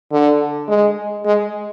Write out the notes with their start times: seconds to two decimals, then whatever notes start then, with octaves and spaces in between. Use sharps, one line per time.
0.12 D3
0.69 G#3
1.26 G#3